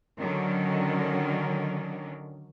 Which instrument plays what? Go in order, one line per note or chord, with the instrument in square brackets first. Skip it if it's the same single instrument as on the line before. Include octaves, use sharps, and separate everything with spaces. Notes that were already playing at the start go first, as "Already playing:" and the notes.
[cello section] D3 D#3 F#3 C#4